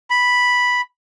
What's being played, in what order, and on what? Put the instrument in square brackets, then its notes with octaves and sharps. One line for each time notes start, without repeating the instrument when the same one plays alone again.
[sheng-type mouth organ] B5